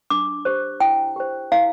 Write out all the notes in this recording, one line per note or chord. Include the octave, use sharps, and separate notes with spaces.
D4 D6
G4 C5
E4 G5
G4 C5
E4 F5